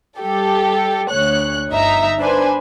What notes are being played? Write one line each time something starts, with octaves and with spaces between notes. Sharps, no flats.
G3 G4 A4
D2 C#5 F#6
G1 D#4 E5 A#5
D4 B4 C5 G#5